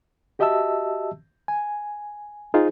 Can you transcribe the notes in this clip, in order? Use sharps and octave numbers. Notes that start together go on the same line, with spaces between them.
F#4 G4 D#5 E5 A5 E6
G#5
D#4 F4 G#4 C5